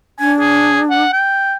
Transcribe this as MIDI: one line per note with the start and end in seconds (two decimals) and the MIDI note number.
0.20 1.04 62
0.20 0.33 80
0.39 0.80 68
0.90 1.10 78
1.12 1.55 79